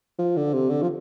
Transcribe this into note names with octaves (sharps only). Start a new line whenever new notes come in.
F3
D3
C3
D3
F3